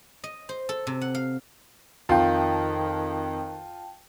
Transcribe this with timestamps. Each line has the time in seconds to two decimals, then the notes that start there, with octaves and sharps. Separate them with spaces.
0.24 D#5
0.49 C5
0.69 A4
0.87 C3
1.01 F#5
1.15 F5
2.09 F2 D#3 F4 G5 A5